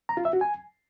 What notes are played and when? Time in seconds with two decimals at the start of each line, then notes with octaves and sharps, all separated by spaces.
0.09 A#5
0.17 F4
0.25 E5
0.33 F#4
0.41 G#5